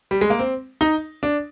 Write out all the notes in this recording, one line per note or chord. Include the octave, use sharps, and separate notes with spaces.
G3
G#3
A#3
C4
D#4
D4